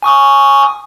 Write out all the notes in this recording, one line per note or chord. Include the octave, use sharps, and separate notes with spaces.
G#5 C#6 D#6